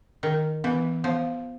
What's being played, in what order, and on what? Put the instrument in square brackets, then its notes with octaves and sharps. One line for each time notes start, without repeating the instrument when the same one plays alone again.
[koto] D#3 [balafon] A#4
[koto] E3 [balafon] B3
[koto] F3 [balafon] B3